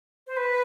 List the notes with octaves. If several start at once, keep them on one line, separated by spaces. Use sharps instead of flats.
C5
B4